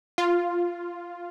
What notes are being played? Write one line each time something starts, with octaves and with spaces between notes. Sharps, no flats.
F4